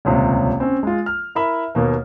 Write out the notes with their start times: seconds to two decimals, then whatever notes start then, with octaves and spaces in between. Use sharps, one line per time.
0.05 D#1 C#2 C3
0.60 C4 C#4
0.83 G#3 F4
1.06 F6
1.35 E4 A#4 E5 B5
1.75 D#2 B2 A#3